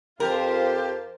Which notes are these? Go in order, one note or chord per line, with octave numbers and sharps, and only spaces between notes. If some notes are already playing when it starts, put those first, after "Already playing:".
F2 F4 G4 A#4 C5